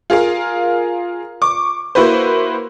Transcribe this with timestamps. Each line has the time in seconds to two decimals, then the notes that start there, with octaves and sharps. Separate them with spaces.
0.10 F4 G#4 A#4 F5
1.42 C#6 D6
1.95 A#3 E4 F#4 B4 C5